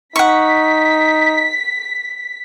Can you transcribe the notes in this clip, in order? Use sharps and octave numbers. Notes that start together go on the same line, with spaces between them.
D#4 F#5 C#6 B6